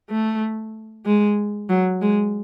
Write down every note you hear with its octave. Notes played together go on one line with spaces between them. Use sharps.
A3
G#3
F#3
G#3